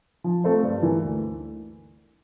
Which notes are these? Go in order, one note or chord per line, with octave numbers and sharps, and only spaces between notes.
F3
A3 C4 F4 C5
G2
E3 A#3
D2